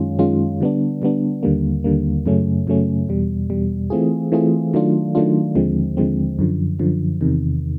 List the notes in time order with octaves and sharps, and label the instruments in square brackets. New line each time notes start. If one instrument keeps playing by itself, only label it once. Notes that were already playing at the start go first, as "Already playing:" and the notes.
Already playing: [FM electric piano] F#2 D#3 G#3 C#4 F4
F#2 D#3 G#3 C#4 F4
D3 G3 B3 D4
D3 G3 B3 D4
D#2 D3 G3 A#3
D#2 D3 G3 A#3
F#2 C#3 F#3 A3 C#4
F#2 C#3 F#3 A3 C#4
E2 B2 G3
E2 B2 G3
E3 A3 C4 F4 G#4
E3 A3 C4 F4 G#4
D#3 F#3 A3 D4 F4
D#3 F#3 A3 D4 F4
D#2 D3 F3 G#3 C4
D#2 D3 F3 G#3 C4
F#2 D3 F3
F#2 D3 F3
E2 C3 D#3